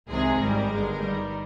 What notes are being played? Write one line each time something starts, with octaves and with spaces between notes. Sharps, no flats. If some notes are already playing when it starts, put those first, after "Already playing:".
C2 C3 D#3 G#3 G#4
G#1 G#2 G3 A#4
G1 G2 D3 G#3
G2 D#3 G3